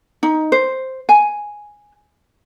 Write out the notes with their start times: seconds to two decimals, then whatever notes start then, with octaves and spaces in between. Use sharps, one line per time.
0.23 D#4
0.52 C5
1.09 G#5